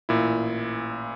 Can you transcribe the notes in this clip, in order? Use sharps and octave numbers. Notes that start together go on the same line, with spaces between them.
A1 A#2 E4